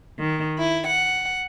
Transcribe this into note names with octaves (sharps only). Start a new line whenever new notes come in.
D#3
E4
F#5